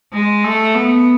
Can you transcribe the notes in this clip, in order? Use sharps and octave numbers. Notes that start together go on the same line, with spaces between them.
G#3
A3
B3